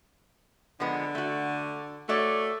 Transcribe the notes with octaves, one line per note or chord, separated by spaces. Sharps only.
D3 F3 G#3 B3
A3 F#4
A3 F#4 C#5 D5